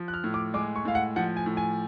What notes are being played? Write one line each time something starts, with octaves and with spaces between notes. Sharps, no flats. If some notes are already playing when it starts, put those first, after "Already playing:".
Already playing: F3
F#6
F6
A2
D6
G#3 D6
C#6
A2 F5
F#5
F3 F#5
G#5
A2
G#5